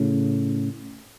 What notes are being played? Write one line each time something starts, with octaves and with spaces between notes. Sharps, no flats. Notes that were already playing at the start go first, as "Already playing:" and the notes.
Already playing: A2 C#3